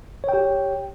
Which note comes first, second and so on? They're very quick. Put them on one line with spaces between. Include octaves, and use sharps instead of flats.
C#5 G5 G4